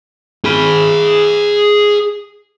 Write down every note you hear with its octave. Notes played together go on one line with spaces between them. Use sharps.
G#4 B5